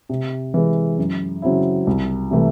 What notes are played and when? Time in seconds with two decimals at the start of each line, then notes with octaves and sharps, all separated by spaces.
0.09 C3
0.54 E3 G#3
0.98 F#2
1.42 C#3 F#3 C4 E4
1.87 C2
2.31 C3 E3 A3